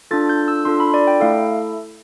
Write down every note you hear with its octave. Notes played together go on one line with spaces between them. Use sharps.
D4 F4 A4 A6
G6
E6
D4 F4 A4 C6
B5
D5
G5
A3 E4 A4 F5